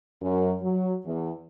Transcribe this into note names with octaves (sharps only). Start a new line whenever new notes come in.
F#2
F#3
E2